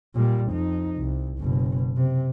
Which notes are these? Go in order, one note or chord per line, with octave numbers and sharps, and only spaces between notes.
A#2 G3
F2 D#4
C2
F#1 B2
C3